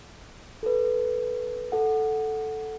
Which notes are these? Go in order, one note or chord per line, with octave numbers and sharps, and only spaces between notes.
A4 B4
A4 F#5